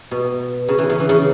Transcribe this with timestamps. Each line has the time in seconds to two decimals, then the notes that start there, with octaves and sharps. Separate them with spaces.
0.11 B2
0.68 C#3
0.78 E3
0.89 C#3
1.00 E3
1.09 C#3